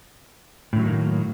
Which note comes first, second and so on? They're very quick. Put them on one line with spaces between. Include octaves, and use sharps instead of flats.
A2 D3 F#3 D#3 A#3